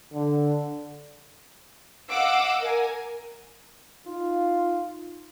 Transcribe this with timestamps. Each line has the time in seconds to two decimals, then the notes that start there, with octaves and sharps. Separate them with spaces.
0.13 D3
2.10 D#5 F5 F#5 D6 E6
2.61 A#4 G#5
4.08 D#4 F4